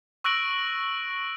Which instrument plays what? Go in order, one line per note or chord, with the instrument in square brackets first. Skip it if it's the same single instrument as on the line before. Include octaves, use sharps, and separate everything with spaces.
[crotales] C#6 E6 F#6 A#6 D7 F#7